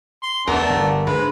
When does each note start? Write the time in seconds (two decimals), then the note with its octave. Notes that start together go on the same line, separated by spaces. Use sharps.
0.23 C6
0.47 E2 A3 B3 D4 A#4
0.70 G1
1.07 G#2 G#3 D4 B4